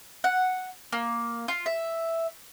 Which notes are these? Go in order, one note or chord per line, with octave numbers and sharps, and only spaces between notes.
F#5
A#3
F4
E5